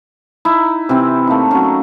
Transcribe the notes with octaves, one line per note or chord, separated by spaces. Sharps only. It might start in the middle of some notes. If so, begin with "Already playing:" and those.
D#4 E4
C3 E3 C4
A3 A#3 D#4
F#3 C#4